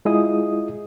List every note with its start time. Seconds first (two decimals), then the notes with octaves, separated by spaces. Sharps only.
0.05 G#3 E4 F4 G#4 D#5 D#6